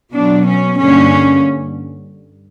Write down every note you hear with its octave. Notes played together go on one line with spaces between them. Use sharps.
B2 F#3 B3 D4
C#4
G2 D3 A#3 C#4